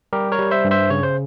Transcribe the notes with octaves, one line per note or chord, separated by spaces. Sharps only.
G3 G4 A#4
A#4 C#5
G3
C5 E5
G2
C5 E5
C#3 C#5
C5